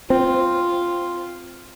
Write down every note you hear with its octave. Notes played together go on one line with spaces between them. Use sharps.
C4 F4